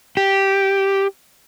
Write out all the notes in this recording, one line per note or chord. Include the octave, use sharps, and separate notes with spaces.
G4